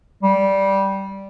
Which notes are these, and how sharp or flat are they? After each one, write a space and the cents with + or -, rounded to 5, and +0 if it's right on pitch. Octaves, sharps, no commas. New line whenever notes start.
G3 -10